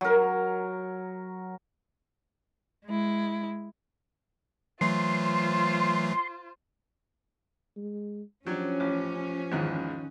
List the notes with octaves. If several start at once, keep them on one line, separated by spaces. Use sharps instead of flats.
F#3 A#4
G#3 E4
E3 F#3 A3 F4 C5 C6
G#3
F3 F#3 C#4 D4 G4 C#5
A1 D6
A#1 E2 G#2 D#3 F#6 D#7